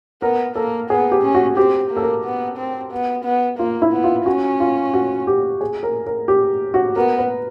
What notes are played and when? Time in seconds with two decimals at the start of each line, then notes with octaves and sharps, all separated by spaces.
0.22 B3 A#4
0.55 A#3 A4
0.90 B3 G#4
1.11 G4
1.23 C#4
1.35 F#4
1.57 C4 G4
1.90 A#3
1.96 A4
2.02 A#4
2.24 B3
2.58 C4
2.92 B3
3.25 B3
3.58 A#3 F4
3.82 E4
3.93 B3
4.04 F4
4.26 C#4 F#4
4.60 F4
4.94 F#4
5.27 G4
5.61 G#4
5.83 A#4
6.07 A#4
6.28 G4
6.74 F#4
6.96 B3 A#4
7.18 B4